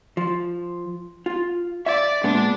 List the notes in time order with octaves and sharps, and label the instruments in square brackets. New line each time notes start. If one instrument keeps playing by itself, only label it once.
[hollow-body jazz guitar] F3
F4
[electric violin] D5 [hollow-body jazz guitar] E5
[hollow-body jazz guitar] A#2 G#3 B3 [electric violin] D4